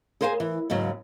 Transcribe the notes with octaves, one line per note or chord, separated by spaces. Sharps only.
G#4 A#4 C5 F5 G5 G#5
E3
D#2 G#2 C#3 F#3